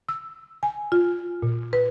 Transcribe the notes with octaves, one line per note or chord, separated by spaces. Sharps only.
E6
G#5
F4
A#2
B4